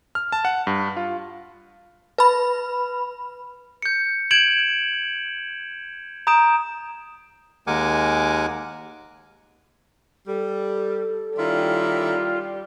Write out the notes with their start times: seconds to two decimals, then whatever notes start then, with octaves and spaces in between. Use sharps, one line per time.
0.15 F6
0.32 A5
0.45 F#5
0.67 G2
0.97 F4
2.18 B4 B5
3.82 G6 C#7
4.31 G6 G#6 D7 E7 F#7
6.27 A#5 D#6 G6 D7 E7
7.67 D#2 G#3 A#4 F#5 G#5 D6
10.27 G3 A4
11.38 D#3 G3 C#4 E4 F4